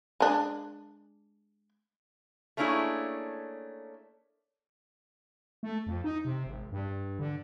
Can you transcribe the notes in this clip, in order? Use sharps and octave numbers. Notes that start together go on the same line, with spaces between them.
G#3 D4
A3 A#3 C#4 D4 E4 G#4
A3
F2
D#4
C3
G#1
G2
D3